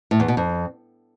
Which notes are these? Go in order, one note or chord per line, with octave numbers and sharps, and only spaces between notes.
A2
E2
B2
F2